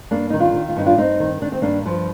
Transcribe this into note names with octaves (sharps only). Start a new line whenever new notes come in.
G2 A#3 D4
D#3 D#4
D4 F4
D#3
F4
G2 D#4
D4 F4
G2 C4 D#4
D#3
D#3 D4
C4
G2 A#3 D4
G2 F3